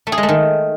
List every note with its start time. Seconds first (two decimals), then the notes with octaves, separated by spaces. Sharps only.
0.07 A3
0.12 G#4
0.18 G#3
0.23 A3
0.29 D#3